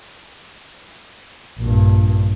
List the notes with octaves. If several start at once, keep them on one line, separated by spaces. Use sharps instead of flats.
A#1 G2